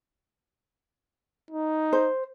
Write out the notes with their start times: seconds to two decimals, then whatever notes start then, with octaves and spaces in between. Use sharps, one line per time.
1.51 D#4
1.93 C5